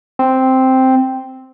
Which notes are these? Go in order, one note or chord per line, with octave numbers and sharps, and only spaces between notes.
C4